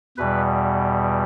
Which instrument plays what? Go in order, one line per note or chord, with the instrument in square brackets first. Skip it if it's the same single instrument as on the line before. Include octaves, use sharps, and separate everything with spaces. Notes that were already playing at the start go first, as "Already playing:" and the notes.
[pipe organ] E2 B2 G3 B4